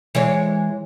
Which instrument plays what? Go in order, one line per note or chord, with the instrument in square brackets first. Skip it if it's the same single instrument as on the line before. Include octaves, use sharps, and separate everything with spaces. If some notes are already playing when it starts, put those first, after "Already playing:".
[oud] E3 G#3 C#5